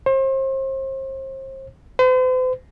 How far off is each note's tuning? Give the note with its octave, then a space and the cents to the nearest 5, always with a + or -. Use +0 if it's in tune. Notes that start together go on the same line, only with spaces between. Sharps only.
C5 +35
C5 -45